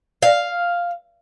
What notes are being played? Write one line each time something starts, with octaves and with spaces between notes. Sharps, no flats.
F5